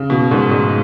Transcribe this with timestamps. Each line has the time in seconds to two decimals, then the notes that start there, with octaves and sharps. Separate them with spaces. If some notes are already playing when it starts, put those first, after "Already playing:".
Already playing: C#3
0.10 B2
0.31 G#2
0.51 G#2